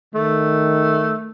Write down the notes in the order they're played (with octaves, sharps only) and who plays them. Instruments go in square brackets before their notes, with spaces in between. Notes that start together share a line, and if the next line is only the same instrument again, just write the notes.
[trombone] D#3 [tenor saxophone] A3